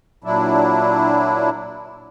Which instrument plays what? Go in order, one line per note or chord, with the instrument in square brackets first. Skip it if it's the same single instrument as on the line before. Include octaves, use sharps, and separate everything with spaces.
[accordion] A#2 F#3 D4 E4